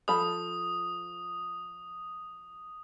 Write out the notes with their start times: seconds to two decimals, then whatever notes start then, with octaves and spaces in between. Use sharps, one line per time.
0.08 F3 A4 B5 D#6